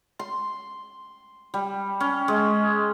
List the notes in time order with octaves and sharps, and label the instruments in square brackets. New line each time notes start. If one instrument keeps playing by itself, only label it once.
[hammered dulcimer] C6
G3
C#4
G#3